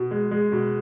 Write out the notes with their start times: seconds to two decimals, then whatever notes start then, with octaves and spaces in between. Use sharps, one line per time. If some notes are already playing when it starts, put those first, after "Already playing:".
Already playing: B2
0.11 G#3
0.31 G#3
0.52 B2